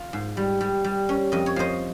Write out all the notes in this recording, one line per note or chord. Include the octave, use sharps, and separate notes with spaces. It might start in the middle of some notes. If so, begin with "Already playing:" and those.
Already playing: F4
G#2
G3
G3
G3
C#4
F2 D#5
C#5
F3 C5 D#5